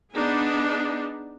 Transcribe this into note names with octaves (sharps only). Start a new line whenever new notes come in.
B3 D4 D#4 G#4